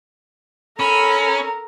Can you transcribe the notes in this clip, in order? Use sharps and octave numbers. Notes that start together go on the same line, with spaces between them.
C#4 A4 A#4 B5